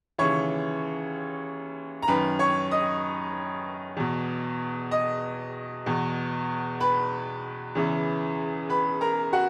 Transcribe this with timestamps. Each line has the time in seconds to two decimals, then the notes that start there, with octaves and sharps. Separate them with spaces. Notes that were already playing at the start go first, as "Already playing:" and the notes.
0.18 D#2 C#3 E3 C#5 C#6
2.02 A#5
2.08 F#2 D#3 B4 B5
2.39 C#5 C#6
2.71 D#5 D#6
3.97 E2 B2
4.91 D#5 D#6
5.86 E2 B2
6.80 B4 B5
7.75 E2 C#3 E3
8.70 B4 B5
9.01 A#4 A#5
9.33 F#4 F#5